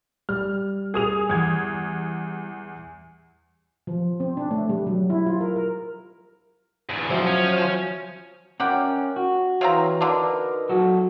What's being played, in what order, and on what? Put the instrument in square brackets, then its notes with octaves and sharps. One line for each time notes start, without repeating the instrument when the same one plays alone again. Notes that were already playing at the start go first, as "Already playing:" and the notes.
[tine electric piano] G3 [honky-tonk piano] F6
[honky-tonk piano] G#4 D#6 F7
E2 G#6
[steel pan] F3
C4
D4
A3
G3
F#3
E4
F4
A#4
A#4
[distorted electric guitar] E2 G2
[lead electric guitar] F3 [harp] F#3 E5
[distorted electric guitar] C#4
[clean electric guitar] C#4 A#4 [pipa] D5 F#5 G5
[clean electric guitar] F#4
[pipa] C#3 C4 A#5 [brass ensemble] E3
[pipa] D3 D4 [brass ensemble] D#4 A#4 B4
[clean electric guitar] F#3 F#4 A4